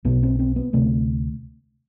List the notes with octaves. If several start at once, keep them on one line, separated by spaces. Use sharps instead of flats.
B1 B2 B3
C4
C4
B3
D2 C3 A3